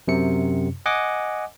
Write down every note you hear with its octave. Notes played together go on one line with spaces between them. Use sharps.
F#2 C3 C#7
D#5 F#5 G#5 D6